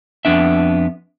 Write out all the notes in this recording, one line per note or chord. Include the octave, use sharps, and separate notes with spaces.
F2 B3 D4 E5